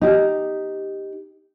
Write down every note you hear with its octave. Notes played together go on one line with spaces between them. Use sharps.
D#4 G4